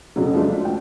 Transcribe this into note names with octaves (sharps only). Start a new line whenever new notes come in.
F2 C#3 F#3
F3 G#3 A3 D4
G5